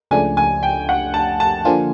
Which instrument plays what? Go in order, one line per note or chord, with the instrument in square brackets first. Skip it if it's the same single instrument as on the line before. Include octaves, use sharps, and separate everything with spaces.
[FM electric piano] C#2 C#3 F3 A3 D4 [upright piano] G#5
[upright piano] G#5
G5
F#5
A5
A5
[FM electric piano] D3 F3 A#3 D4 F4 [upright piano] G#5